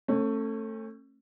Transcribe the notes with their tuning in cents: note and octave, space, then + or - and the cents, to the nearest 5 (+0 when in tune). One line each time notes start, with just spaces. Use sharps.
A3 +20 C#4 -35